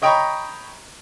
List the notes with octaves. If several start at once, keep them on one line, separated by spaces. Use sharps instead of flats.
C#5 D#5 G5 A#5 B5 C#6